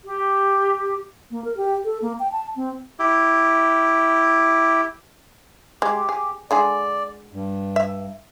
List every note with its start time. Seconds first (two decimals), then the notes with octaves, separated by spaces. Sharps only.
0.03 G4
1.31 A#3
1.45 A#4
1.57 G4
1.85 A4
2.02 A#3
2.20 G5
2.32 A5
2.56 C4
2.99 E4 G4
5.82 G#3 G4
6.09 G#4
6.51 D3 G#3 G#4 D5
7.32 G2
7.76 E5